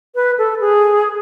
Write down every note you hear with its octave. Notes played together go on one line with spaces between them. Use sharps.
B4
A4
G#4